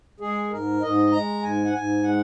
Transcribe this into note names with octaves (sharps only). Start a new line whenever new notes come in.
G#3 G#4
G#2 A#4
G#2 D#5
G#3 A#5
G#2 G#5
F#5
G#2 G#5
G#3 F#5